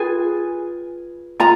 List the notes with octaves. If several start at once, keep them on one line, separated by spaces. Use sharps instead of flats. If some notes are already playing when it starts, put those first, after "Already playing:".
Already playing: F4 G#4 B4 G#5
F4 A#5